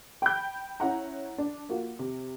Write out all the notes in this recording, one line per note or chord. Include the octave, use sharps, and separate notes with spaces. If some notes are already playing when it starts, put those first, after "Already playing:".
G5 B5 G6
C#4 E4 F#5 A#5
D4
A#3 F4 F#4
C3